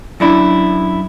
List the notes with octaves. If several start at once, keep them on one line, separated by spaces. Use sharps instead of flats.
F#2 D4 E4